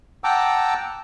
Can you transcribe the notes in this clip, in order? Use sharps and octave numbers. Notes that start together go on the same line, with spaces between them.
F#5 G5 A5 A#5 D6 E6